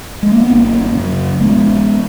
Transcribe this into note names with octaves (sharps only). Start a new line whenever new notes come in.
G#3
A#3
B3
G#1 A#3 C#4
F#2 C#3
A#1 G#3 B3